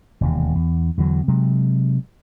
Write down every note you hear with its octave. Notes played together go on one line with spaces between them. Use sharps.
E1 D#2 C3
E2
E2 D3 D#3 F#3
C3 F#3 G#3